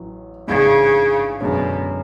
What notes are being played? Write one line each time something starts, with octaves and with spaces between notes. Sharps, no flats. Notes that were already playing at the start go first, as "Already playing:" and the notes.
Already playing: A1 A2 F#3
A1 G#2 C#3 G#3 D4
F#2 B2 D3 G#3 C#4